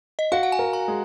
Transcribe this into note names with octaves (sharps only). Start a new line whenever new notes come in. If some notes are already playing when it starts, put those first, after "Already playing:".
D#5
F#4 F5
F#5
G#5
A#4
A#5
G#3